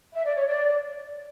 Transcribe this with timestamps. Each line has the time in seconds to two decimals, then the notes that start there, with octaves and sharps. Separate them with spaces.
0.13 E5
0.25 D5
0.35 C#5
0.46 D5